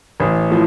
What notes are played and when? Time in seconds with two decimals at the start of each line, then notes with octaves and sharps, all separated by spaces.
0.20 A1
0.50 A2 F3